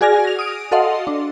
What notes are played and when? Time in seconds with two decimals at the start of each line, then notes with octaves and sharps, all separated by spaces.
0.01 F#4 G#4 D5 G#5 F6 A#6
0.25 A#6 F7
0.39 D#6 D7
0.71 F#4 A4 D#5 F5 F#5 C6
1.07 D4